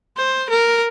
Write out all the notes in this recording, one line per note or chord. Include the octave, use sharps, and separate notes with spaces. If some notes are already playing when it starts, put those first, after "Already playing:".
C5
A#4